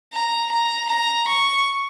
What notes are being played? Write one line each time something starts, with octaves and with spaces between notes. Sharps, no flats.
A#5
A#5
A#5
C#6